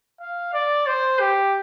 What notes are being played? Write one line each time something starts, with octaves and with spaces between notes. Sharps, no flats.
F5
D5
C5
G4